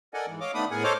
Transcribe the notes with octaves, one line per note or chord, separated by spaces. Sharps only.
A4 A#4 D5 D#5 F#5 G#5
G#2 E3
C#5 D#5 F5 D6
D#3 A3 B3 D4 B5 D#6
A2 B3 G#4 A#4 F#5 G#5
A4 C5 C#5 D#5 D6 F6